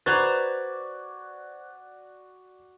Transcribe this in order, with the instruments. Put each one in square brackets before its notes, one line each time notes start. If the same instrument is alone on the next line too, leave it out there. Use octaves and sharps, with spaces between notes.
[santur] F#4 D5 [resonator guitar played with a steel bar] B4 C5 A#5 [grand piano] F#6 G#6 A6